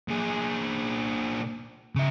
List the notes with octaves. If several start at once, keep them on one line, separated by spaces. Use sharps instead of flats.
A#2 G#4
C#3 E5